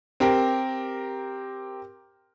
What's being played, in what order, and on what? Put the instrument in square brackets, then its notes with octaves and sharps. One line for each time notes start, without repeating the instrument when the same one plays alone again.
[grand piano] C4 G4 A#4